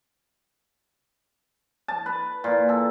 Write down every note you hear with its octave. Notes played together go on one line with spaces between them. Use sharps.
A5
B4
A#2
A4